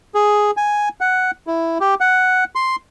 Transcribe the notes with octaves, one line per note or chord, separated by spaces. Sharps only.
G#4
G#5
F#5
E4
G4
F#5
C6